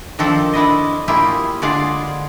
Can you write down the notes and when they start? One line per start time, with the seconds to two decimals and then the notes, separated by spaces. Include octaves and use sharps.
0.19 D#3 F3 C4 D4 A4
0.53 D4 E4 D#5
1.08 A#3 E4 F4 G4 G#4
1.62 D3 G#3 D4 F4 G#4 D5